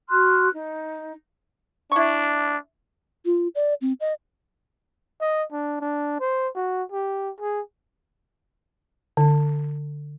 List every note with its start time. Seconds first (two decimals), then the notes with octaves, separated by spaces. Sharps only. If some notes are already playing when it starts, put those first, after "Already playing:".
0.10 F#4 C6 F6 F#6
0.53 D#4
1.92 D4 E4 C#6
3.25 F4
3.55 D5
3.81 C4
4.01 D#5
5.21 D#5
5.52 D4
5.81 D4
6.20 C5
6.55 F#4
6.92 G4
7.41 G#4
9.17 D3